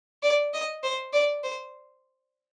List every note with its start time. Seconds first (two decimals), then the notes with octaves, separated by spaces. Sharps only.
0.23 D5
0.54 D#5
0.83 C5
1.13 D5
1.44 C5